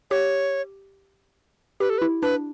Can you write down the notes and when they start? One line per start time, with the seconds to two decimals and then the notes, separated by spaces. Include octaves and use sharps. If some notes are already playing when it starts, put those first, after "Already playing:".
0.11 G4 C#5
1.80 G4 B4
1.90 A4
1.98 B4
2.02 E4
2.22 D4 B4